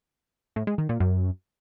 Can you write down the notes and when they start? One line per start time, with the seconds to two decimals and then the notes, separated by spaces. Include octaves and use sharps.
0.56 A2
0.67 G#3
0.78 D#3
0.89 A#2
1.00 F#2